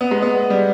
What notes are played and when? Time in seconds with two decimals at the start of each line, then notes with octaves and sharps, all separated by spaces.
0.01 B3
0.11 G#3
0.22 B3
0.50 G3